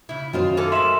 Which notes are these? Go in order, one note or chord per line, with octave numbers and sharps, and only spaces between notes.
C#3 E4
F#2 D#3 F4 C5
A#3 C#4 A4
G#3 E5 C6 E7